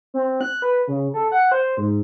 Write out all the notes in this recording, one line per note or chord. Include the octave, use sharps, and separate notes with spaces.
C4
F#6
B4
C#3
A4
F#5
C5
G#2